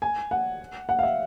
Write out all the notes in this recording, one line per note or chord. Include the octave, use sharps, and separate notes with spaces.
G#5
F#5
F#5
F5
E5